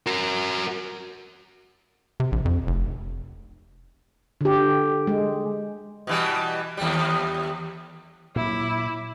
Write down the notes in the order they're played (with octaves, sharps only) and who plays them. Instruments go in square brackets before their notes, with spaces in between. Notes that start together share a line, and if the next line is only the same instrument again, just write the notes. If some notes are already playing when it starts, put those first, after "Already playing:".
[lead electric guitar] F#4 A#4
[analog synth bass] C3
A#1
F2
F1
[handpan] D3 G4
G#3
[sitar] B2 E3 G3
D#2 G3
[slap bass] A#2 F#3 [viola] E4 D6